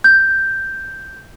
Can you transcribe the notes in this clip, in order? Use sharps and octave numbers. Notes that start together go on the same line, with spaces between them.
G6